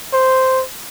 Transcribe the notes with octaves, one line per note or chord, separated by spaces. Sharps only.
C5